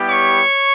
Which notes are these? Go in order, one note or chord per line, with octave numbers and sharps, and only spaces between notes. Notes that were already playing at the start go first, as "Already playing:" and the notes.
Already playing: G3 B3 E4 G4
C#5 C#6